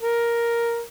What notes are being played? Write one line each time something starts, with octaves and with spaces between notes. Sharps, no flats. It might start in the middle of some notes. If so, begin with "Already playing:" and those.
A#4